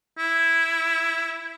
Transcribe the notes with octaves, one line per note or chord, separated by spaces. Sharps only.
E4